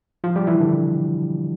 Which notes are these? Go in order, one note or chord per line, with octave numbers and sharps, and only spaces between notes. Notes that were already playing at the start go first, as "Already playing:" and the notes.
F3 F4
G3 G4
E3 E4
D3 D4